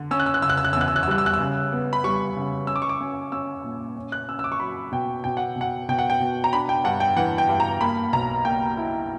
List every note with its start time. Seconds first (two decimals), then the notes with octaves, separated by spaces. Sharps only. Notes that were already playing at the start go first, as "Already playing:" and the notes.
Already playing: D3
0.11 C#4 E6
0.20 F#6
0.26 E6
0.34 F#6
0.42 C#3 E6
0.49 F#6
0.58 E6
0.65 F#6
0.73 E2 E6
0.81 F#6
0.88 E6
0.96 F#6
1.03 E6
1.08 G3 F#6
1.18 E6
1.26 F#6
1.34 E6
1.40 C#3
1.72 B3
1.93 B5
2.04 G3 C#6
2.36 C#3
2.67 C#4 E6
2.76 D6
2.82 C#6
2.89 D6
3.01 C#4
3.32 C#4 E6
3.64 A#2
3.97 C#4
4.12 F#6
4.28 C#4 E6
4.39 E6
4.44 D6
4.52 C#6
4.60 F#3 B5
4.92 B2 G5
5.24 B2 G5
5.37 F#5
5.56 B2
5.61 F#5
5.89 B2 G5
5.99 F#5
6.10 G5
6.20 B2
6.44 A#5
6.53 D4 B5
6.69 G5
6.84 G2 F#5
7.00 G5
7.16 E3 F#5
7.38 G5
7.49 G2
7.60 A#5
7.81 A#3 B5
8.13 B1 A#5
8.45 A#3 G5
8.77 E4